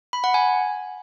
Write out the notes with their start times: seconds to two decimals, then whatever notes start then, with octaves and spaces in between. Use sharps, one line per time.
0.13 B5
0.24 F#5
0.34 G#5